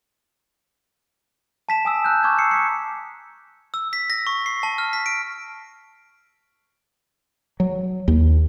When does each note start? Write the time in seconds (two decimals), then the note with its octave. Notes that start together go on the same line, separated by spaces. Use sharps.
1.69 A5 B6 E7
1.85 G#5 D#6 E6
2.04 A#5 F#6 G6
2.23 A#5 C#6 D6 E6 F6 G#6
2.39 D#6 C7 C#7
2.51 D6 B6 C#7
3.74 E6
3.93 B6
4.10 A#6
4.27 C#6
4.46 C7
4.63 A5
4.78 F6
4.93 B6
5.06 D7
7.60 F#3
8.08 D#2